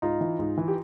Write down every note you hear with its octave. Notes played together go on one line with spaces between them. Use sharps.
G#2 D#4 F4
E3
G#2
E3
G4